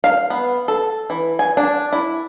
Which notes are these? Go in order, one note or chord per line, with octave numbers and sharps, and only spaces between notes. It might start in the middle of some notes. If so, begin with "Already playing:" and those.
F5
B3
A4
E3
G#5
D4
E4